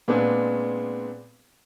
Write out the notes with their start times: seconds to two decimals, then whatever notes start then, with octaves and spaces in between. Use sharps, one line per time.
0.08 A#2 G#3 B3 C4 D4 G#4